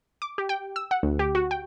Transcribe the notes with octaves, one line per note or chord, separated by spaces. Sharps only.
D6
G4
G5
E6
F#5
D2
G4
F#4
G5